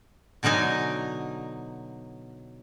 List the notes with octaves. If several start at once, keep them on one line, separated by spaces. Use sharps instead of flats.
B2 D3 F#3 D#4 G#5